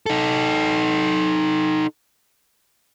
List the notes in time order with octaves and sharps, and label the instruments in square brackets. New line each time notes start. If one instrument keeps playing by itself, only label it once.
[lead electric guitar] D#4 A4